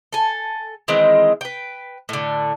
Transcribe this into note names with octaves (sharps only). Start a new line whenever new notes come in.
A4 G#5
D#3 E3 G#3 C4
B4 G5
A2 D3